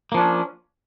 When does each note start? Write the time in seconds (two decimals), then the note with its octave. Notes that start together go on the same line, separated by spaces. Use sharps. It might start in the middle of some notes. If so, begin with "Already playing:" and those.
0.12 A#3
0.14 F3
0.17 D4
0.20 C#4